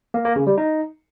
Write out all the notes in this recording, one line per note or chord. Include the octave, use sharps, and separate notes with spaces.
A#3
A#3
C#3
G3
D#4